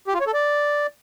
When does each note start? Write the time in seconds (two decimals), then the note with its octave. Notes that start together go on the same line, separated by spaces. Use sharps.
0.07 G4
0.14 F4
0.20 C#5
0.27 A4
0.33 D5